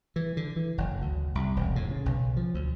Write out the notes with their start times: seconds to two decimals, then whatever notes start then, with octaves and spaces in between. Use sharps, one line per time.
0.16 E3
0.37 D3
0.56 E3
0.78 F#1
1.02 D2
1.35 C2
1.56 E1
1.76 A2
1.91 C#3
2.06 B1
2.36 F3
2.54 D2